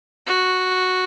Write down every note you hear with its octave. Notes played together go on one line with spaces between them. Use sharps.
F#4